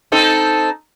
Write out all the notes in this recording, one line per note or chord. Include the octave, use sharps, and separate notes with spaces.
C4 D#4 A4